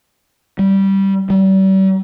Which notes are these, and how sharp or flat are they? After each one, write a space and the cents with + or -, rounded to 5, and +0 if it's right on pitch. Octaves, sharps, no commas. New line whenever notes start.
G3 -10
G3 -40